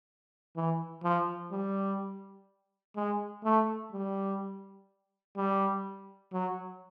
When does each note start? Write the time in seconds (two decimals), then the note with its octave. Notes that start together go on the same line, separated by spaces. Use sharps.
0.56 E3
1.03 F3
1.52 G3
2.96 G#3
3.44 A3
3.92 G3
5.37 G3
6.33 F#3